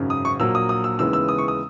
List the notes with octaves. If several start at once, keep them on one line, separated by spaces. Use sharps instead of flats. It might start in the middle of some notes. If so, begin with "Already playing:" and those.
Already playing: G#1 F#2 C#3
D#6
C#6
A#1 A#2 F#3 A#3 E6
D#6
D#6
E6
D#2 C#3 E3 G#3 B3 E6
E6
D#6
C#6
D#6